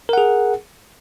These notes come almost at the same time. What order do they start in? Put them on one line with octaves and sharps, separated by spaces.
A#4 F#5 G#4